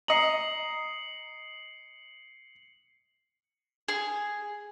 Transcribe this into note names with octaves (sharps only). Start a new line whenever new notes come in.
D#5 A#5 C7 C#7 F#7
G#4